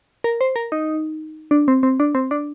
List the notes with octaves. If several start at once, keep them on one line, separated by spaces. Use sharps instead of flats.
A#4
C5
A#4
D#4
D4
C4
C4
D4
C4
D4